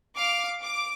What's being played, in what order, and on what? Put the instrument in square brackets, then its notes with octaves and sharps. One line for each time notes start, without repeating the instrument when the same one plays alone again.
[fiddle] F5 [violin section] D6
[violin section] D6